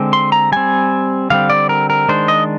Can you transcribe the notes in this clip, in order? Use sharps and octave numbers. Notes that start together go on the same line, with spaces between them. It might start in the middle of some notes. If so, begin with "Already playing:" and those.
Already playing: D3 G#3 C4
C6
A#5
G3 C4 G#5
D3 G3 C4 F5
D5
A#4
A#4
D#3 G#3 D4 C5
D#5